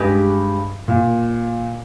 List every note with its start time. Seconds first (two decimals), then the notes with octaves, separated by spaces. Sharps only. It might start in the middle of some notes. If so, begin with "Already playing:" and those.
Already playing: G2 G#3 C#4 G4 B4 D#5
0.88 A#2